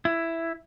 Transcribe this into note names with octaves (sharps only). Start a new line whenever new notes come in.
E4